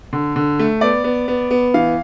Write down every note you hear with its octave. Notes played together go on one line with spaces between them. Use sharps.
D3
D3
A3
B3 D5
B3
B3
B3
E3 F5